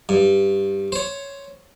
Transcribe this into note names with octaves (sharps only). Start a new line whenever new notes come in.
G2
C5 C#5